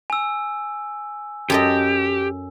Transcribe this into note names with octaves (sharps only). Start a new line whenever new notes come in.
G#5 E6
F#2 G4 A4 D#5